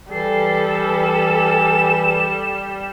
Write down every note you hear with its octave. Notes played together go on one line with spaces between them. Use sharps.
E3 G3 A4 C7
E3 E7